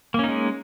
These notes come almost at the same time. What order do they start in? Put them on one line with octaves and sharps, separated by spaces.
A#3 C#4 D#4 G#3